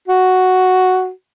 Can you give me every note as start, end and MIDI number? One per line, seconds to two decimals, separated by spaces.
0.08 1.10 66